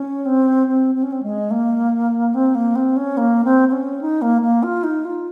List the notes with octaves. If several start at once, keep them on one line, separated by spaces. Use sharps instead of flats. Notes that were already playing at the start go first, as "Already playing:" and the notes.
Already playing: C#4
C4
C4
C4
C#4
C4
G#3
A#3
C4
A#3
C4
C#4
A#3
C4
C4
C#4
D#4
A#3
A#3
F4
D#4
F4